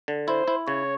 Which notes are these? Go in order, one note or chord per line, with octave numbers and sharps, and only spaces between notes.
D3
E4 C5
E4
C#3 C#5